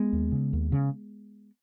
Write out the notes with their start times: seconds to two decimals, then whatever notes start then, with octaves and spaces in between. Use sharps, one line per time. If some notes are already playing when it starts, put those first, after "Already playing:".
Already playing: G#3 B3
0.13 D#2
0.32 C#3
0.53 D#2
0.72 C#3